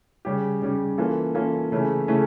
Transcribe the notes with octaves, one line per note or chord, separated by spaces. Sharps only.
C#3 G3 C#4 G4
C#3 G3 C#4 G4
E3 A#3 C#4 F4 A4
E3 A#3 C#4 F4 A4
C#3 E3 A3 C#4 E4
C#3 E3 A3 C#4 E4